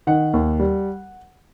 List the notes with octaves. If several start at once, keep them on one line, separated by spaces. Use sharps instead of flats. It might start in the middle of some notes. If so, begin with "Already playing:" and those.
D#3 F#5
D#2
G3